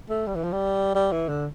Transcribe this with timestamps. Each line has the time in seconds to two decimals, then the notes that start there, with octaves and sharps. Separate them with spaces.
0.10 A3
0.27 G3
0.36 E3
0.44 F3
0.53 G3
0.95 G3
1.12 E3
1.29 D3